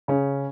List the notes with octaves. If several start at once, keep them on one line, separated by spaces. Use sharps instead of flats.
C#3 C#4